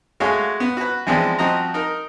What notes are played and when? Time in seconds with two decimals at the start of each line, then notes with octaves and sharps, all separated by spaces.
0.20 G#3 A3 F#4 C#5 F5 G#5
0.60 B3
0.77 F#4 B4
1.07 E3 F3 G#3 B3 C4 D4
1.38 F3 C4 F#4 D#5 A#5
1.74 D#4 A#4